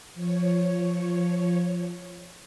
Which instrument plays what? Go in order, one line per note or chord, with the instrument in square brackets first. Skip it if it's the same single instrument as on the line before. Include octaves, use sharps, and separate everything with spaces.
[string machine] F3 C#5